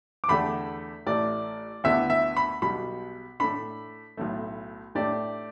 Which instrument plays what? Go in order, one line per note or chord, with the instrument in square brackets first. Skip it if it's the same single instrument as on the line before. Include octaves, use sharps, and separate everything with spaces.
[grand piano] D6
[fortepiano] E2 D3 A3 G4 [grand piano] B5
[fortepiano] A1 A2 A3 [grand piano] D5
[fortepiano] D2 D3 B3 E4 G4 [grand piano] E5
[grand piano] E5
B5
[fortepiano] B1 B2 G3 [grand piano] B5
[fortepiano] A2 A3 D4 [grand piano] B5
[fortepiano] B1 A2 A3
[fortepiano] A2 A3 D4 G4 [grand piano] D5